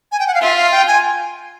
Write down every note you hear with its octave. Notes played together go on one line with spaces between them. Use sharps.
G#5
G5
F#5
F5
F4 E5
F5
G5
G#5